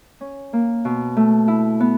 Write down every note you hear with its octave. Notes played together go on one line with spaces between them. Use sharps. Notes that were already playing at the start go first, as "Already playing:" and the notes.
C#4
A#3
B2
A3
E4
B3